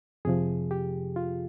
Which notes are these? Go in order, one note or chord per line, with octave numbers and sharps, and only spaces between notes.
F2 C3 F3 G#4
G4
F4